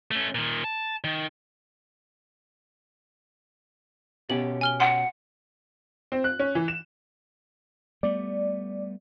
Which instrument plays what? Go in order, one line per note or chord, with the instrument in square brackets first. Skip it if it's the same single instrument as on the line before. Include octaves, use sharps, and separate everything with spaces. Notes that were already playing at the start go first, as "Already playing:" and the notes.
[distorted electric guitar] A3 C#4
A#2 D#3
A5
D#3
[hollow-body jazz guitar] B2 C#4 G4 [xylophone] F#7
[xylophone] G#5 F6 G7
[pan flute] F#5 [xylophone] C6
[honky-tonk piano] C4
F#6
C#4
E3
E7
[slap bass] G3 A3 B3 [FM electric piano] D5